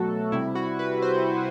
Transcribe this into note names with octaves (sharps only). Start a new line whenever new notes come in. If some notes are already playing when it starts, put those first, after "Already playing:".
Already playing: B2 F#3 A3 F#4 A4
C3 G3 E4
F#4
B4
C5